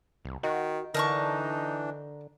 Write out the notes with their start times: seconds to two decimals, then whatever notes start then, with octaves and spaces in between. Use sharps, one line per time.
0.25 C2
0.43 D#3 F#4
0.94 D3 E3 D4 D#4 A#4 A5 C#6